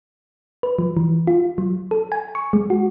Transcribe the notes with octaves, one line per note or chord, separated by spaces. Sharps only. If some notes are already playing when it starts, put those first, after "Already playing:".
B4
F3
E3
F4
F#3
A4
G#5
C#6
G#3
F#4